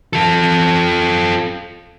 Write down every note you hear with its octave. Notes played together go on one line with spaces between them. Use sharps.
F4 A4